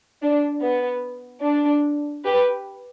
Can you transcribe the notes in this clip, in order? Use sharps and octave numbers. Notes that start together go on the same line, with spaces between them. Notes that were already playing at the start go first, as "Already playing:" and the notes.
D4
B3
D4
G4 B4